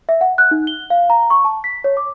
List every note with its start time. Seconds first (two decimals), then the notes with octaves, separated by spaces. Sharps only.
0.09 E5
0.21 F#5
0.38 F#6
0.51 D#4
0.67 G7
0.90 F5
1.10 A#5
1.30 C#6
1.45 A5
1.64 B6
1.84 C#5
1.97 D6